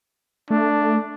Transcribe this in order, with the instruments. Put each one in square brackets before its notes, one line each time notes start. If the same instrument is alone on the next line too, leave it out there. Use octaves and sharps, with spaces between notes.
[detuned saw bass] A3 [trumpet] D4